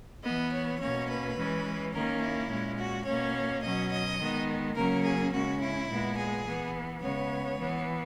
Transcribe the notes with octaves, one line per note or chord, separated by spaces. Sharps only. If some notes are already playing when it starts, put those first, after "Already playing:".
E3 B3 D#5
C#5
B2 A#3 C#4 C#5
B4
E3 G#3 C#4
D#3 A#3 C#4 A#4
E4
A#2 G#3 C#4
F#4
B2 A#3 C#4 C#5
B2 F#3 C#4 D#5
D#5
D#3 G#3 B3
C#3 F#3 A#3 C#4 A#4
G#4
C#3 G#3 C#4 F#4
E4
A#2 G#3 B3
G#4
E3 B3
C#3 G#3 B3 C#5
E3 B3